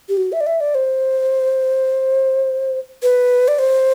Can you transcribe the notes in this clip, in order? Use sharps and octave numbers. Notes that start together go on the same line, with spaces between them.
G4
F#4
E5
D5
E5
D5
C5
B4
D5
C5